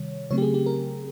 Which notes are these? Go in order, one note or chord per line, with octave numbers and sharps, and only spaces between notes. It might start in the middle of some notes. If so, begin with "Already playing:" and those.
Already playing: C3 D#3 G3 C#5
C#3 F#3 A3 C4 C#5
G4
G#4
G4
A#4